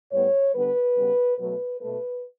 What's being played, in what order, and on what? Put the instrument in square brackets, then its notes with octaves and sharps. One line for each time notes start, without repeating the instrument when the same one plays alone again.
[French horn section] A2 G3 B3 C#5
D3 G3 B3 B4
C#3 G3 B3
B2 F#3 A3 B4
B2 A3 B4